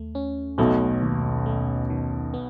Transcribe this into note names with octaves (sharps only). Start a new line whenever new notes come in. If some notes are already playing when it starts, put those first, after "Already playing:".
Already playing: D#2 A3
C#4
B1 B2 A3
D#2
A3
D#3
B3